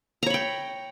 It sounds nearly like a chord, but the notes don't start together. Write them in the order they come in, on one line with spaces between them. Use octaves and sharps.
A#5 C#5 B5 G5